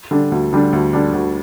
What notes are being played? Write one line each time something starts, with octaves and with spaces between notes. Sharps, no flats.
D3 G3 D4
D2
D3 G3 D4
D2
D3 G3 D4
D2